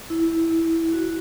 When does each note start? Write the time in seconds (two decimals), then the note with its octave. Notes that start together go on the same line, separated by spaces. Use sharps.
0.10 E4
0.94 F#4